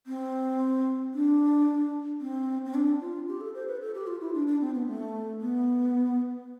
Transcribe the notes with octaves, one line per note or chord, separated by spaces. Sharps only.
C4
D4
C4
C4
D4
F4
G4
A4
C5
B4
A4
G4
F4
E4
D4
D4
C4
B3
A3
B3